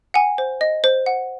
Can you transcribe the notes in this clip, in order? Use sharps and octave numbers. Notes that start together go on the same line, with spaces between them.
F#5 G#5
C5
D#5
C5
F#5